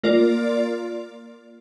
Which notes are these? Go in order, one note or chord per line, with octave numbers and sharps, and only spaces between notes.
A#3 F4 A#4 D5